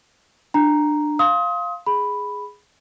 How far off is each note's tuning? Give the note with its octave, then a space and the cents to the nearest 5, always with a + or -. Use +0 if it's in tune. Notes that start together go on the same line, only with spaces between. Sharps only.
D4 +20 A#5 +0
F5 +0 C6 +15 D#6 +30
G#4 +0 B5 +0